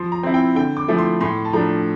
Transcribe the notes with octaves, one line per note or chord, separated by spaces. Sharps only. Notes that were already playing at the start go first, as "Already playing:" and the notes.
Already playing: F3 C6
A#5
C4 E4
G5
D3 G5
D6
F3 A3 E4
C6
A2 C6
A5
F3 A3 D4 A#5